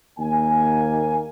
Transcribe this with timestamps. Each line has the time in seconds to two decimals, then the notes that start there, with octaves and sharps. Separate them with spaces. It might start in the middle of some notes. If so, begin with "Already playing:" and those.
0.18 D#2 A#3 A#4 G#5